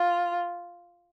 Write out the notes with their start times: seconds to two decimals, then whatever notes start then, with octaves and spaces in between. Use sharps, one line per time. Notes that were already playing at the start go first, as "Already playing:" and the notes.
Already playing: F4